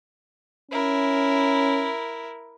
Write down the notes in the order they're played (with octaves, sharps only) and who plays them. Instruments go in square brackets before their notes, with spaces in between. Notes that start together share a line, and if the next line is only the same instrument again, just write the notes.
[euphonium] C#4 [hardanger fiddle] E4 A#4